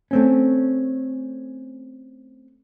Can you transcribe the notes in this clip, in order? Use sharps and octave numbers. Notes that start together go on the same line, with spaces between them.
A3 C4 C#4